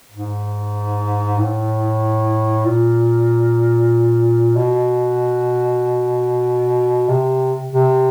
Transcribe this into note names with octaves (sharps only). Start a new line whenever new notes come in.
G#2
A2
A#2
B2
C3
C3